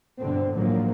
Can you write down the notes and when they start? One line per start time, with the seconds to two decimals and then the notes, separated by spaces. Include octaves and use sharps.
0.20 G1 B2 D3 C4
0.53 A1 G#2 D3 F3 F#3 A#3